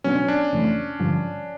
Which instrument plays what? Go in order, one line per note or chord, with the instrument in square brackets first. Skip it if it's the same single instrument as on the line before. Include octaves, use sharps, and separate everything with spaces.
[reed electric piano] B2 F#3 B3 D4 [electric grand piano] C#4
[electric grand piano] D4
[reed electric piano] F2 C3 E3 A3
G2 D3 F3